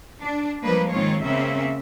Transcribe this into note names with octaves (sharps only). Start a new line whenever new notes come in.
D4
F3 G3 G#3 A#3 B4
G#2 D#3 G#3 C4 F4 C#5
C#3 A#3 C4 C#4 E5